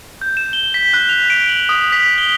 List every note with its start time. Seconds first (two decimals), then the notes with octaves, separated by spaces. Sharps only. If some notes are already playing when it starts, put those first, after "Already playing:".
0.21 G6
0.37 E7
0.53 G7
0.74 B6
0.94 F#6
1.09 F7
1.30 D7
1.49 F#7
1.69 D#6
1.92 B6
2.18 G7